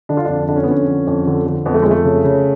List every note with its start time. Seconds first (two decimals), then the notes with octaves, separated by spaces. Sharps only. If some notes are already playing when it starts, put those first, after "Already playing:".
0.09 D3 D4
0.17 F4
0.25 F2 D4
0.48 D3 D4
0.56 C#4
0.63 B3
0.68 F2 C#4
0.87 D3
1.07 F2
1.27 D3
1.46 D3
1.66 F2 B3
1.74 A3
1.82 F2 G#3
1.91 A3
2.05 C#3
2.24 C#3